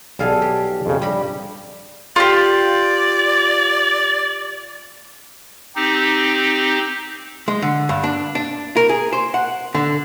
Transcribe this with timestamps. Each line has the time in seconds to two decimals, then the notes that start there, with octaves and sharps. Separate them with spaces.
0.19 B1 G3 G#4 A4 F5
0.42 G4
0.86 F2 C#3
1.02 G2 G3 G4 B5
2.16 F4 G4 D5
5.76 C4 D#4 G4
7.48 G#3
7.62 D3
7.89 G2
8.04 D4
8.35 D4
8.77 A#4
8.89 G#4
9.13 C5
9.34 F#5
9.75 D3